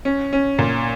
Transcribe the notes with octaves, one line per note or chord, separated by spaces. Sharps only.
C#4
C#4
A#2